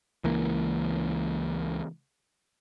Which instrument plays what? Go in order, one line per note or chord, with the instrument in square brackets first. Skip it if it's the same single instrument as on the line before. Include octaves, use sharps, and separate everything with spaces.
[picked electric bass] C#2 E3 A#3